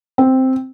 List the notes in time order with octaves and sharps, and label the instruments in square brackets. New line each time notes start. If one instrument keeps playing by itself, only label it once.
[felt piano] C4